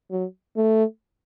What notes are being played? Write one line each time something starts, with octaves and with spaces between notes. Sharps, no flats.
F#3
A3